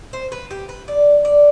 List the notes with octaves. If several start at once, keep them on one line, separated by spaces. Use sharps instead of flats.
C5
B4
G4
B4
D5
D5